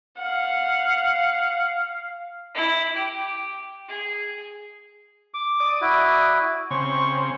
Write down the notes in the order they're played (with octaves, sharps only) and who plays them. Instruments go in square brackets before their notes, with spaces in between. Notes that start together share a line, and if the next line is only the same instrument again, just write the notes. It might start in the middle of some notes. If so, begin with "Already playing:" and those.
[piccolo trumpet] F5 [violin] F#5
[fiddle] E4
G4
G#4
[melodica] D6
[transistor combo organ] D5 D#6
[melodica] E4 F#4
[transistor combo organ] C#3 C4 [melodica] C#6